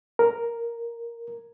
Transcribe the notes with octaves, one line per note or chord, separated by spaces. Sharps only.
A#4